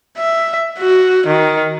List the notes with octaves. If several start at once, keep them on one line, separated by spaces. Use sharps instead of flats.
E5
F#4
D#3